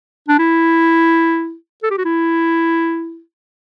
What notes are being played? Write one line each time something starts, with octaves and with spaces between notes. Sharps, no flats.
D4
E4
A4
G4
F#4
E4